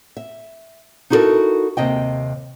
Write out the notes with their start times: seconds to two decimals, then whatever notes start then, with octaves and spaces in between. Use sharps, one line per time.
0.17 E5
1.10 D#4 E4 F#4 G4 A4 A#4
1.77 D#2 C3 D#5 G5